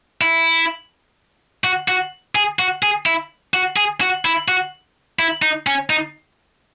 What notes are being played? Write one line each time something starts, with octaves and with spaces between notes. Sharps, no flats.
E4
F#4
F#4
G#4
F#4
G#4
E4
F#4
G#4
F#4
E4
F#4
E4
D#4
C#4
D#4